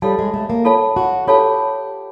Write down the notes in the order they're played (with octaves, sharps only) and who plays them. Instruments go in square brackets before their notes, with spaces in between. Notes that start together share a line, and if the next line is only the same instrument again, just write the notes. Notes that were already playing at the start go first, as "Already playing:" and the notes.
[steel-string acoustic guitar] G3 [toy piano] F4 A4 C#5 F5 A5
[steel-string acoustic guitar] G#3
A3
A#3
[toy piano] F4 A4 C#5 F5 A5
[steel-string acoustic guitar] F#4
[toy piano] F4 A4 C#5 F5 A5 [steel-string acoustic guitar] G4